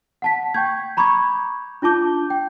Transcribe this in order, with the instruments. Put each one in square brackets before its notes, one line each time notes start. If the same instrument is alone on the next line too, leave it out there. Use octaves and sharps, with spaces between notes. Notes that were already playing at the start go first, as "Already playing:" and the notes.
[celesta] F#5 A5 B6
G5 C#6 G6 G#6
A#5 B5 C#6 D6 G6 G#6
D4 F4 A5 D6 G6
G5